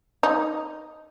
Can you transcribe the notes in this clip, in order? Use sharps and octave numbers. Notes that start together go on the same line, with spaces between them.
D#4